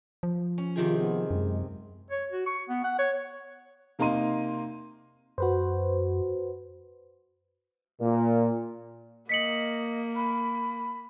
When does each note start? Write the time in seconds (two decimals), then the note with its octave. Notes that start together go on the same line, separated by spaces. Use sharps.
0.23 F3
0.58 C#4
0.76 C3 D#3 F4 G#4
0.98 B3
1.31 F#2 G#3
2.11 C#5
2.31 F#4
2.46 C#6
2.68 B3
2.84 F#5
2.99 C#5
3.99 C3 A#3 D#4 A#5 C6 D#7
5.38 F#2 F#4 B4 C5
8.00 A#2
9.29 A#3 D#5 B6 C#7 F#7
10.15 B5